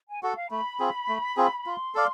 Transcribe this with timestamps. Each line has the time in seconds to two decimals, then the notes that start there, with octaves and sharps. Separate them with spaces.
0.09 G#5
0.22 F#4 A4 F#5
0.36 F5
0.51 A3 B5
0.80 C4 F4 G#4
1.08 A3
1.37 C4 F4 G#4
1.66 F4 C6
1.95 A4 D5 F5